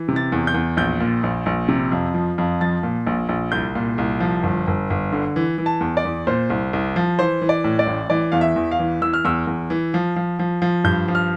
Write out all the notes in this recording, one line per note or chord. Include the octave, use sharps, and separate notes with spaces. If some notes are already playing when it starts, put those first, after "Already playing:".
Already playing: E3
C3
A6
E2
G6
E2
A#1 G6
A#2
A#1
A#1
C3
F2
F3
F2
F3 A6
A#2
A#1
A#1
C2 G6
A#2
C2
F3
G1
G1
G1
D3
E3
E3
A5
E2
D5
E2
A#2 C5
C2
C2
F3
E3 C5
E3
D5
A2
D5
A1
E3 D5
E2 F5
E5
E2
F5
E3
E3 E6
F6
E2 E6
E2
E3
F3
F3
F3
F3
G2 G6
F3
F6